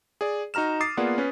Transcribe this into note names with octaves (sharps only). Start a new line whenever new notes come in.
G#4 D5
D#4 F#4 A#5 F6 E7
D6 D#6 A6 C7
A#3 B3 F4 G#4 D5 F#5
C#4 B4